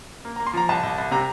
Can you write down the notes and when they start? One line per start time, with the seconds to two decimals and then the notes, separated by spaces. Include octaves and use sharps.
0.25 A#3
0.36 A#3 A#5
0.46 C6
0.53 F3 A#5
0.69 C2 A5
0.83 C2
0.98 C2
1.11 C3 A#5